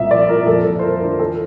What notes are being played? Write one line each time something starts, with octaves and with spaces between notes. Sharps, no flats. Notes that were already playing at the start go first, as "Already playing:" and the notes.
Already playing: C2 A#2 E5
F3 D5
A#2 A#4
F2 A4
F2
C5
F3 A#4
D3
E3 A4